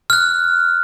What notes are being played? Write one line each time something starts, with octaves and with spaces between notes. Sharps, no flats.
F6 F#6